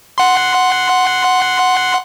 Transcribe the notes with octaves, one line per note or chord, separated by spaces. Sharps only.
F#5 C6